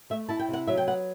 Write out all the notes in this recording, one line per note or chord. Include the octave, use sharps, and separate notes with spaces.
A3 E5
E4 A5
G5
C3 F#5
F#3 E5
G5
B3 F#5